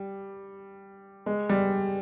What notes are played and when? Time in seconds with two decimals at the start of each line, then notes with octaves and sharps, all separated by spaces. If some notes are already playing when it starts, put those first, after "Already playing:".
Already playing: G3
1.26 G#3
1.49 G3